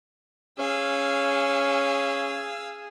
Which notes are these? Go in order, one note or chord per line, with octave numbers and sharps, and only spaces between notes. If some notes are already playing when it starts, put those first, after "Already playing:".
C#4 G#4 F5 E6